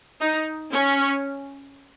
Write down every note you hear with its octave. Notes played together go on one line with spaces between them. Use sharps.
D#4
C#4